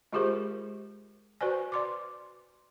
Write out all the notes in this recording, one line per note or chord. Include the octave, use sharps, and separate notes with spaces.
G#3 F4 G4 G#4 A#4 C5
F#4 B4 C5 D5 G#5
D5 C6 D6